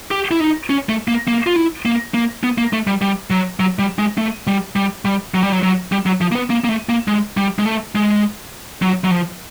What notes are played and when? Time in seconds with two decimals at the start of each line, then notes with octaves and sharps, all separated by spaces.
0.11 G4
0.31 E4
0.40 D#4
0.70 C#4
0.89 A3
1.08 A#3
1.28 A#3
1.47 F4
1.56 E4
1.85 A#3
2.14 A#3
2.43 B3
2.58 A#3
2.73 A3
2.87 G3
3.01 G3
3.30 F#3
3.60 F#3
3.79 G3
3.99 G#3
4.18 A3
4.47 G3
4.76 G3
5.05 G3
5.34 F#3
5.43 G3
5.52 F#3
5.63 F#3
5.92 G3
6.06 F#3
6.21 F3
6.32 A#3
6.35 B3
6.50 A#3
6.64 A#3
6.69 A3
6.89 A#3
7.08 G#3
7.37 G3
7.59 G#3
7.66 A3
7.95 G#3
8.82 F#3
9.04 F#3
9.11 F3